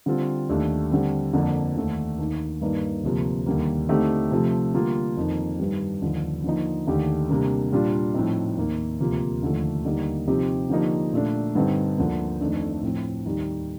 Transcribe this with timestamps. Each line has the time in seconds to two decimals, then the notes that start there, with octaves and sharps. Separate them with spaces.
0.06 D3 G3 C4 F4
0.49 D#2 D#3 A3 D4 G4
0.91 D3 G3 C4
1.33 F2 D3 F3 A#3
1.76 D#2 D3 A3
2.19 D#2 D#3 A#3
2.61 G2 D#3 A#3 D#4
3.04 D2 C3 F3 A#3
3.46 D#2 D3 G3 A#3
3.89 D3 A3 C4 D#4 G4
4.31 C3 F3 A3
4.74 D3 G3 A#3 F4
5.17 F2 D#3 A#3
5.59 G2 D#3 G3
6.02 D#2 D3 F3
6.44 D3 F3 A#3 D#4
6.87 D#2 D3 A3 D#4 G4
7.29 C3 G3 A#3 D4
7.72 A#2 G3 D4 F4
8.14 A2 F3 C4 D#4
8.57 D#2 D#3 A#3
9.00 D2 C3 F3 A#3 F4
9.42 D#2 D3 F3 A3
9.85 D#2 D3 G3 A#3 D#4
10.28 C3 F3 C4 D#4 G4
10.70 D3 F3 A#3 D#4 G4
11.13 A#2 A3 D4
11.55 G2 D3 G3 C4 D#4
11.98 D2 D3 F3 A#3
12.41 F2 D#3 A3 D4
12.83 A2 F3 C4
13.26 D#2 D#3 G3